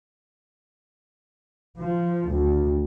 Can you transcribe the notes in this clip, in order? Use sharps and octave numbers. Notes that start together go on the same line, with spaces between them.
F3
D2